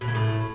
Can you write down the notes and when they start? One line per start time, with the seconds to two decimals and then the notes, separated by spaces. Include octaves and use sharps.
0.01 B2
0.08 C#3
0.15 A2